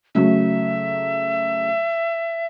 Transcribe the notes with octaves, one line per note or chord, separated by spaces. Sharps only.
C#3 F#3 A3 E5